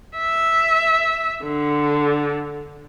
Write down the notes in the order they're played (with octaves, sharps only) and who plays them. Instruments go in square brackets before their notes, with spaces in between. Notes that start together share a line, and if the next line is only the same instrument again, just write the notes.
[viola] E5
D3